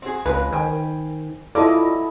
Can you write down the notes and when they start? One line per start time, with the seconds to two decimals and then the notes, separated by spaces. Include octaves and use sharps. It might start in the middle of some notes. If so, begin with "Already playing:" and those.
0.02 C4 F#4 G#4
0.26 C#2 G#3 A#3 C4 B4
0.52 D#3 C5 G5 G#5
1.55 F#3 G#3 E4 F4 A4 D5 D#5